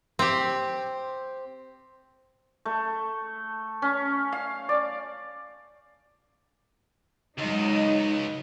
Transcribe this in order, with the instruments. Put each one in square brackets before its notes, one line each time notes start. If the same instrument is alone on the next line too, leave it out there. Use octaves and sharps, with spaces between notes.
[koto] C4 G4
[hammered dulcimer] A3
C#4
F5
D5
[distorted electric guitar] C#2 [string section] G#2 F#3 D#5 [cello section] D#4